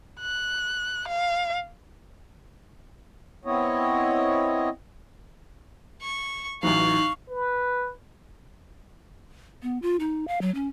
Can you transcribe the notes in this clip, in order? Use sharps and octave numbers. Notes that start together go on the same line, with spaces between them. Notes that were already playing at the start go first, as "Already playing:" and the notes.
F#6
F5
B3 C4 E4 C#5 D#5
C#6
A1 E3 F#3 D#4 F5 C#6 F#6
B4
B3
F4
D#4
F5
F#3
C#4